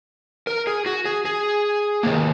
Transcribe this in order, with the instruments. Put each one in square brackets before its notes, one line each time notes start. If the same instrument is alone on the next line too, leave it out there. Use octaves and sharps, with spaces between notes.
[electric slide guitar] A#4
G#4
F#4
G#4
G#4
D#3 A#3